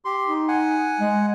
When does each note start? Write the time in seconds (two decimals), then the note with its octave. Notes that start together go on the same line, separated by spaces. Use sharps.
0.05 G4 C6
0.27 D#4
0.48 F#5 G#5
1.00 G#3